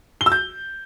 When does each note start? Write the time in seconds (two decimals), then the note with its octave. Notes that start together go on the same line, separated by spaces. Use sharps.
0.21 G7
0.26 E6
0.32 G6